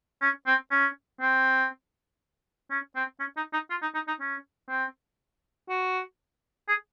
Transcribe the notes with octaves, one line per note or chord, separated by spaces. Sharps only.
C#4
C4
C#4
C4
C#4
C4
C#4
D#4
D#4
F4
D#4
D#4
D#4
C#4
C4
F#4
G#4